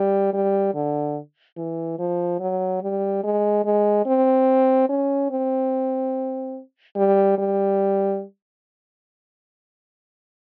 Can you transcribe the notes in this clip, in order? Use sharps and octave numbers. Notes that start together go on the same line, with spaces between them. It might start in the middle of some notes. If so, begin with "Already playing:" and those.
Already playing: G3
G3
D3
E3
F3
F#3
G3
G#3
G#3
C4
C#4
C4
G3
G3